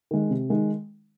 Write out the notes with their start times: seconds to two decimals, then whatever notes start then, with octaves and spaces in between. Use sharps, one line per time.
0.11 D#3 G#3
0.30 C3
0.50 D#3 G#3